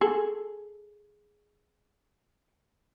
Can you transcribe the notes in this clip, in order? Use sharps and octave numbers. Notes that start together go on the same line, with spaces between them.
G#4 A4